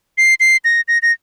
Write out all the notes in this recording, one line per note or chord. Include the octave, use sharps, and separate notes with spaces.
C7
C7
A#6
A#6
A#6